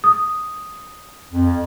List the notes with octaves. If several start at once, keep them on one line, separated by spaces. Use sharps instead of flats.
D#6
F2